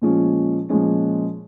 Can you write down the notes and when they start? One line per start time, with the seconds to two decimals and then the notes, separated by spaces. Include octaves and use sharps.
0.02 A#2 F3 G#3 C#4
0.69 A#2 F3 G#3 C#4